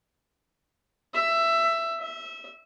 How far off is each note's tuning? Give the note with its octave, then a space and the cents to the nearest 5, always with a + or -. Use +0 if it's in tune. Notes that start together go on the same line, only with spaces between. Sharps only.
E5 +15
E5 -20